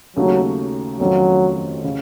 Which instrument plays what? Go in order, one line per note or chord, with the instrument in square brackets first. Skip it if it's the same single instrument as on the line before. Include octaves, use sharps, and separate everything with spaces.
[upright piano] D#2 C#3 A3 D#4 F#4 [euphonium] F#3
[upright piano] F2 D#3 A3 C#4 F4 [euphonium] F#3
[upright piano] C#3